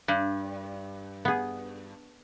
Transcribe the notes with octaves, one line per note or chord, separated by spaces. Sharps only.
G2
B3 G#4